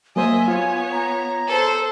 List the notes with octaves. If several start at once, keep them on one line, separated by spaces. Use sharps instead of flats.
F#3 A#3 C5 D#5 E5 G#5
B3 F4 C#5
A#5
A4 C5